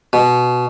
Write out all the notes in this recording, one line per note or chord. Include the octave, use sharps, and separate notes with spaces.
B2